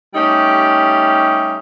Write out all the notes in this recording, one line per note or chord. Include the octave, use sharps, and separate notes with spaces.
G3 A3 C#4 D#4 G4